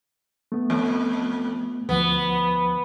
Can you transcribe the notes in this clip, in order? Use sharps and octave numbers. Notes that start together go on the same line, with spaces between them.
A3 B3
F2
D2 F3 B3